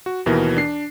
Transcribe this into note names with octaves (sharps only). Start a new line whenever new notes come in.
F#4
D#2 B2 E3 A#4
D4 C7